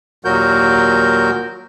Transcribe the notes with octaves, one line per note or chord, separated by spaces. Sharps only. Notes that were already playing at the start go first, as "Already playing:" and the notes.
D#2 A#2 F#3 F#4 A#4 G6